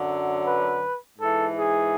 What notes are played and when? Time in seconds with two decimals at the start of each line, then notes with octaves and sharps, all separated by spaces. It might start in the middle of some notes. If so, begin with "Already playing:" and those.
Already playing: F#2 D3 F#3
0.44 B4
1.18 G#2 E3 A4
1.56 G#4